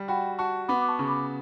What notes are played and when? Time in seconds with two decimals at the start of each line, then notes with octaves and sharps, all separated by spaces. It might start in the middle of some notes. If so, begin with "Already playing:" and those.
Already playing: G3
0.08 F#4 G5 B5
0.39 F#4 A5 C#6
0.68 B3 B5 D6
0.81 D6
0.88 A5 C#6
0.99 C#3 C#6
1.08 B5 D6